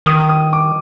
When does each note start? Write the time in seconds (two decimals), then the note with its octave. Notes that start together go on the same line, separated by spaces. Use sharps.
0.06 D#3 D#6
0.29 D#6
0.53 D6